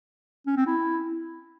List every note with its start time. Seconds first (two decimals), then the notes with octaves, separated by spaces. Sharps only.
0.47 C#4
0.57 C4
0.67 E4